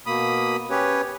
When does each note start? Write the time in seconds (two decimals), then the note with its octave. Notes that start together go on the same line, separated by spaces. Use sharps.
0.06 B2 A#3 B5 D#6
0.70 C#4 G4 B4 C#5